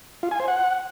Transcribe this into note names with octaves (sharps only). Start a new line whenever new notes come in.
F4
G#5
C5
F#5